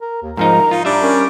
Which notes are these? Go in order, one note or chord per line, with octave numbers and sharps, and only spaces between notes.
A#4
D#2
G#2 F3 D#4 A#4 A#5
D#4 F4
G3 D4 E5
C#4 A#4